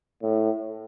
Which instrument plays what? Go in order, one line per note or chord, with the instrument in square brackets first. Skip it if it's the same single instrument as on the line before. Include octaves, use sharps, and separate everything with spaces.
[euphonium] A2